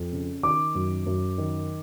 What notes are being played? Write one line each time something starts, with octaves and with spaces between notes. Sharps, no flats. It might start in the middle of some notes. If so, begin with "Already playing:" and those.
Already playing: F2
C#3
D#3 D6
F#2
F#2
D#3